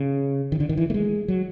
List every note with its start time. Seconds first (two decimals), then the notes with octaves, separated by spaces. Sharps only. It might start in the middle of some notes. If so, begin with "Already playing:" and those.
Already playing: C#3
0.52 D#3
0.60 D3
0.69 D#3
0.77 E3
0.90 A3
0.94 G#3
1.28 F#3